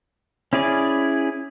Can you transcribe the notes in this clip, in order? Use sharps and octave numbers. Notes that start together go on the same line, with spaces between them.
C#4 E4 G#4 D5